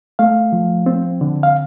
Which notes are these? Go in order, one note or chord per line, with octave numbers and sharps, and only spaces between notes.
A3 F5
F3
C4
D3
F5